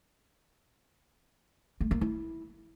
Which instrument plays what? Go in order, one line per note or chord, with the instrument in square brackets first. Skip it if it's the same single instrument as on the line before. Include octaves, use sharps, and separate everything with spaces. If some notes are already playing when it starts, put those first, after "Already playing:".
[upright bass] A3
A#3
E4